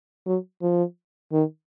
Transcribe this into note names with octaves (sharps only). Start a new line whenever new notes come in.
F#3
F3
D#3